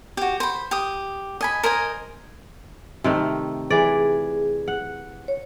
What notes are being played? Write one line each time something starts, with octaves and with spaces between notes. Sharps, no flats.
F#4 G4
C5 B5
G4 D#6
D#5 G#5 B5
A#4 C5 D#5 G#5
C3 D#3 A3
E3 G#4 D5
F#5
C#5